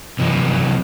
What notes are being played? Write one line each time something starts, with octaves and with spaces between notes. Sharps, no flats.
C3 E3 F#3